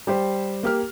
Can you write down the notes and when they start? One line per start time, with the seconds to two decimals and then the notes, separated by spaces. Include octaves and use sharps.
0.07 G3 G4 C5
0.63 A#3 G4 F6